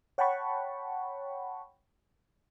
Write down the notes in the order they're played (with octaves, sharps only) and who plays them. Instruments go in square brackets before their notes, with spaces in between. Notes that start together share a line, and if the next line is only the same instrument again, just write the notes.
[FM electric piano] C#5 F#5 G5 A5 B5 C#6